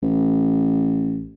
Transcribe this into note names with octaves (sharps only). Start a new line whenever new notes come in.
A1